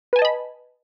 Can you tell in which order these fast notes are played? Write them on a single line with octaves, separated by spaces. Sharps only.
B4 G#5 A5 D#5 B5